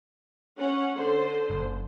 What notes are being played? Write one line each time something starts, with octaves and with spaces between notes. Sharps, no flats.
C#4 F#5
D3 C5
F#1